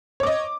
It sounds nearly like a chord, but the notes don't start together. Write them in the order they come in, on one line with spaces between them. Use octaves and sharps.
C#5 D6 D#5